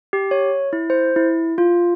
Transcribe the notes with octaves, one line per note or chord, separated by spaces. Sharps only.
G4
C#5
E4
C5
E4
F4